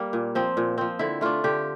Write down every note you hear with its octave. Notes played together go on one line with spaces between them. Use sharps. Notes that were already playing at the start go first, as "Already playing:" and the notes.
Already playing: G3 A#3
A#2
F3 C4
A#2
F3 C4
D3 E4
A3 D4 F4
D3 G4